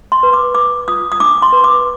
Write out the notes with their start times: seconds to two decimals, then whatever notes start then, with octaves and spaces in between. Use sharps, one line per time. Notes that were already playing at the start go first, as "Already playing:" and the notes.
0.12 C6
0.23 B4
0.33 D6
0.55 B4 D6
0.88 F4 D#6
1.12 D#6
1.20 D4 D6
1.42 C6
1.53 B4
1.64 D6